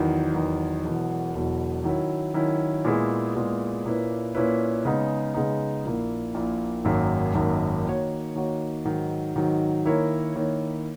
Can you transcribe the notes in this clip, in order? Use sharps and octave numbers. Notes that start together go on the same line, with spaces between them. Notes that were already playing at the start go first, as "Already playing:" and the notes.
Already playing: E2 D#3 F#3
E2 D#3 F#3
E1 E2 B2 F#3
E1 E2 B2 F#3
D#3 F#3 C#4 E4
D#3 F#3 C#4 E4
A#2 G#3 B3 E4 G#4
A#2 G#3 B3 E4 G#4
A#2 A#3 C#4 E4 B4
A#2 A#3 C#4 E4 B4
C#3 G#3 B3 D#4
C#3 G#3 B3 D#4
A#1 A#2 A#3 E4
A#1 A#2 A#3 E4
G#1 F#2 D#3 F#3 A#3
G#1 F#2 D#3 F#3 A#3
D#3 A#3 D#4 F#4 C#5
D#3 A#3 D#4 F#4 C#5
G#2 D#3 F#3
G#2 D#3 F#3
D#3 A#3 E4 A#4 C#5
D#3 A#3 E4 A#4 C#5